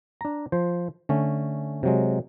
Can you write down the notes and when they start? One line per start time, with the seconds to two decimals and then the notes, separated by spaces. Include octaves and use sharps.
0.21 D4 A#5
0.52 F3 C5
1.09 D3 A3 C#4
1.83 C3 F#3 G#3